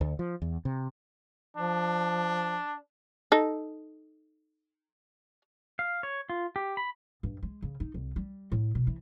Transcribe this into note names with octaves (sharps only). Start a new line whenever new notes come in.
D2
F3
E2
C3
F3 D4
D#4 A4
F5
C#5
F4
G4
B5
G2
G#3
C#3
D#4
C2
G3
A2
B2
E3